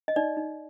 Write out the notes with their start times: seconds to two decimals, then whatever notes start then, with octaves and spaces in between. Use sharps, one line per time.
0.08 D#5
0.16 D#4 D5
0.37 D#4